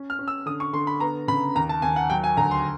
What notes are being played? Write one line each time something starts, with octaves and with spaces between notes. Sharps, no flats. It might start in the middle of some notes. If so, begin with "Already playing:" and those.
Already playing: C#4
F6
C#4
E6
D3 D#6
C#6
D3 C6
B5
B3 A#5
C#3 B5
D#2 A#5
A5
D#2 G#5
F#5
F#3 G5
G#5
D2 A#5
C6